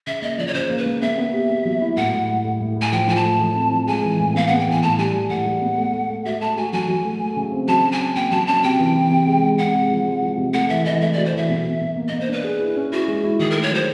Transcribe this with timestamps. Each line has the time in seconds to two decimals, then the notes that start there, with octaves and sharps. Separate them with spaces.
0.07 C#3 E5
0.22 A#3 D#5
0.38 F3 D5
0.47 C#5
0.54 C#3 C5
0.70 A#3
0.78 B4
0.86 A#3
1.02 B3 E5
1.17 B3
1.33 G4
1.49 B3
1.65 F#3
1.81 E4
1.96 A2 F#5
2.12 A2
2.29 A2
2.44 A2
2.60 A2
2.76 A2
2.81 G#5
2.92 F3 G5
3.08 F3 G#5
3.16 A5
3.24 A3
3.40 F3
3.55 C4
3.71 F3
3.87 G#3 G#5
4.03 E3
4.19 A2
4.35 B3 F5
4.48 B3 F#5
4.60 G5
4.67 E3 G#5
4.82 A2 A5
4.98 G3 G#5
5.14 G3
5.30 A2 F#5
5.46 G3
5.62 B3
5.78 A3
5.93 A3
6.10 A3
6.25 F#4 E5
6.41 A3 A5
6.57 F#4 G#5
6.73 F#3 G#5
6.88 F#3
7.05 A3
7.20 A3
7.36 C#3
7.52 C4
7.68 F#3 A5
7.84 C#4
7.92 G#5
8.00 C#4
8.15 A#3 G5
8.31 F#3 A5
8.47 C#4 A5
8.63 C3 G5
8.79 E3
8.95 E3
9.11 C3
9.27 G#3
9.42 G#3
9.58 C3 F#5
9.74 G#3
9.90 F3
10.06 G#3
10.22 F3
10.38 C3
10.53 A3 F#5
10.69 E3 E5
10.85 E3 D#5
11.01 A3 E5
11.13 F#4 D5
11.25 C5
11.33 E3 E5
11.49 B2
11.65 B2
11.81 B2
11.96 A#3
12.08 A#3 D#5
12.20 C5
12.28 D4 B4
12.44 G#4
12.60 E4
12.76 C#4
12.92 E4 F#4
13.08 G#3
13.23 E4
13.39 D#3 G#4
13.51 A3 A#4
13.63 C#5
13.71 F#3 C5